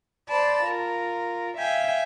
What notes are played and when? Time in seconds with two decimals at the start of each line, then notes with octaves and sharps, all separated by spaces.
0.29 C5 D5 A5 B5
0.64 F4 A#4
1.58 E5 F5 G5 G#5